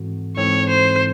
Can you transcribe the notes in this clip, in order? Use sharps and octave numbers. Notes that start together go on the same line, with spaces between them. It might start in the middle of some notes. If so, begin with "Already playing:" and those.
Already playing: G#2 E3 C4 F#4 A4
G#2 E3 C4 E4 A4 C#5
C5